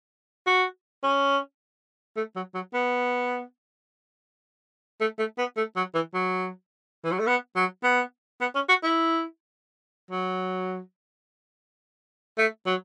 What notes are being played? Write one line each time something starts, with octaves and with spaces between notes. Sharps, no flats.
F#4
C#4
A3
F#3
F#3
B3
A3
A3
B3
A3
F#3
E3
F#3
E3
F#3
A3
B3
F#3
B3
B3
C#4
F#4
E4
F#3
A3
F#3